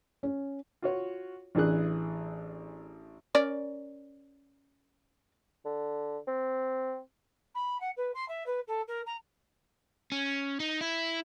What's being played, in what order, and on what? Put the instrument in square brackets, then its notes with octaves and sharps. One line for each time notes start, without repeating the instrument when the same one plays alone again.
[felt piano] C#4
[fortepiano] F4 F#4 C#5
A1 E3 D4 G#4 F#6
[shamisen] C#4 A#4 D5
[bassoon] D3
C4
[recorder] B5
F#5
B4
C6
E5
B4
A4
A#4
A#5
[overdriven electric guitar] C#4
D#4
E4